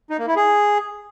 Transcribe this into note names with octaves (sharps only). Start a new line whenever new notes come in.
D#4
A#3
E4
G#4